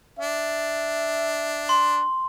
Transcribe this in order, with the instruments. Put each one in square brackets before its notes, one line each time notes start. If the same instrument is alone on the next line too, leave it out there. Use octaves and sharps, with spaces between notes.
[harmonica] D4 [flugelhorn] E5
[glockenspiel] C6